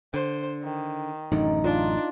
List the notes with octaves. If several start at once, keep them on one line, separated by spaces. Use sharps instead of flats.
D3 C5
D#3
A1 F#2 D3 D#4
D4 F4 D5